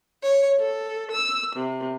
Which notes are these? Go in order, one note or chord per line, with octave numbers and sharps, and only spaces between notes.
C#5
A4
E6
C3